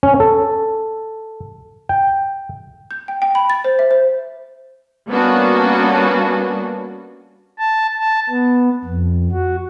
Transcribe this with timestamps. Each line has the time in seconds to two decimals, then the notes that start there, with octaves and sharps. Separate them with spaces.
0.03 C#4
0.20 A4
1.89 G5
2.91 G6
3.08 G5
3.22 G5
3.35 B5
3.50 A6
3.64 C5
3.79 E5
3.91 C5
5.09 G3 A#3 B3 C#4 D4 F#4
7.59 A5
7.99 A5
8.29 B3
8.84 F2
9.32 F#4